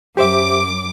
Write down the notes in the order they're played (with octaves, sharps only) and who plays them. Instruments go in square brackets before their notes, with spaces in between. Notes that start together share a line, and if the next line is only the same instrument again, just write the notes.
[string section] F#2 D6 [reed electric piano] G4 C5 E5